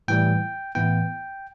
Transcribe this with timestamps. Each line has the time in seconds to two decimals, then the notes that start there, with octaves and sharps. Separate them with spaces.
0.08 A2 E3 G3 G5
0.75 A2 E3 B3 E4 G5